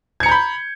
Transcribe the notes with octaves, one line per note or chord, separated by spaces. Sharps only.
A#5 B5 G6 G#6 C#7